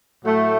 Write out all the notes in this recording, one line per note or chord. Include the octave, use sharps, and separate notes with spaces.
A2 F#3 A3